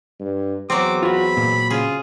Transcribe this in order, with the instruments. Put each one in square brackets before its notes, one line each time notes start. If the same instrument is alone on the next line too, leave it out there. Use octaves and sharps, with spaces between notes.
[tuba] G2
[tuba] E2 [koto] F#3 C4 [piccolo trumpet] D6
[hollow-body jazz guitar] F4 F#4 [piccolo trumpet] B5
[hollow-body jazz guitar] A#2
[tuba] C#3 [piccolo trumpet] F4 [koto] G#4